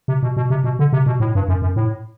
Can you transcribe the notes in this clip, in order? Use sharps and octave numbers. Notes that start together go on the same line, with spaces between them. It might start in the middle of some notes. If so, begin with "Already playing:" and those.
C3
B2
B2
C3
B2
D3
C3
B2
A2
G2
F#2
F#2
A2